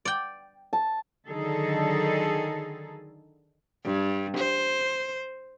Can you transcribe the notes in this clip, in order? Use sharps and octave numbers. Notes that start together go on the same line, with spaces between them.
D5 G5
A5
D3 D#3 F#3 D#4 G#4 A4
G2
C5